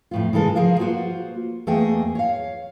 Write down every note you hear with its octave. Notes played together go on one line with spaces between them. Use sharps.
F2 A2 F4
C#3 E3 G#3 A4 A#4
F3 G#4 A#4 F5
A#3 F4 F#4 C5
E2 A3 A#3 G#4 D#5 G5
C#5 F5